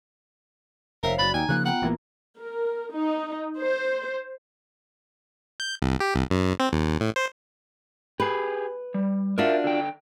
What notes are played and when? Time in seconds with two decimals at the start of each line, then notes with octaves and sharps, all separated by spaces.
1.03 F1 A#4 C5 C#5 E5 F5
1.19 F#1 F#4 D5 B5 A6
1.34 D#2 D#4 G5 G#5 A#5
1.49 C#3 F3 A#3 F#6
1.65 B3 F4 F#5 G5 A#5
1.82 A1 E3 A#3
2.38 A#4
2.95 D#4
3.60 C5
5.60 G6
5.82 C2
6.00 G4
6.15 C2
6.30 F#2
6.60 C4
6.73 D#2
7.00 A2
7.16 C5
8.20 G4 G#4 B4
8.94 G3
9.38 D4 F4 F#4 A#4 E5
9.64 D3 G5